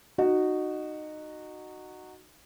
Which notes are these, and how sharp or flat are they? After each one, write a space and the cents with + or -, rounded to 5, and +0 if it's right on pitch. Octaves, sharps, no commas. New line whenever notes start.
D#4 -20 F#4 +0